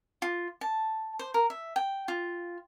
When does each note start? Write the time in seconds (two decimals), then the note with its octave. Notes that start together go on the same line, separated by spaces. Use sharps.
0.22 F4
0.61 A5
1.19 C5
1.34 A#4
1.50 E5
1.76 G5
2.08 F4